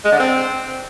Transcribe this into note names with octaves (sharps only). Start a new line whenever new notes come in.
G#3
D3
C4